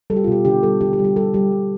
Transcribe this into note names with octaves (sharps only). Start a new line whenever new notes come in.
G3 A4
G4
F4
B2 G4
D3 G4
G3 A4
D3 G4
G4
G3
G4
G3 A4
G3 G4
G3